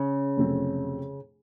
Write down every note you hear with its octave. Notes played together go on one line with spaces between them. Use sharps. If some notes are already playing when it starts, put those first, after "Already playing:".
Already playing: C#3
F2 C3 F#3 A3 C4